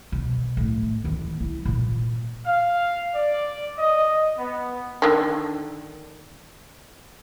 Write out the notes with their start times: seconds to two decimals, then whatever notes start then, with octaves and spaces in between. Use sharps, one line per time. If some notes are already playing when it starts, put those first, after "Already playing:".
0.12 B2
0.57 A2
1.04 D#2 E3
1.40 E4
1.65 A#2
2.46 F5
3.14 D5
3.78 D#5
4.38 B3
5.02 D3 D#3